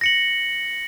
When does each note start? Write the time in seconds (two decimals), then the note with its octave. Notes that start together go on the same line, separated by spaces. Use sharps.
0.01 A#6 C#7 F#7